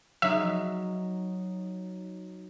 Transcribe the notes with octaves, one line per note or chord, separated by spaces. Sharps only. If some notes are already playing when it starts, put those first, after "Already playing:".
F#3 D#4 E5